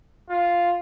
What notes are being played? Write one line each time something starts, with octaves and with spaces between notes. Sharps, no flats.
F4